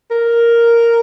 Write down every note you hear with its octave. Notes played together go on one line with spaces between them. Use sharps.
A#4